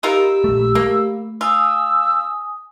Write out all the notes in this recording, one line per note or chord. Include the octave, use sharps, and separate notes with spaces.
D#4 F4 G4 A#4 B5 E6
A#1 A3
A3 A#3
F4 G#5 D#6 E6